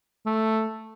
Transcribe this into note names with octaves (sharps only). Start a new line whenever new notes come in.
A3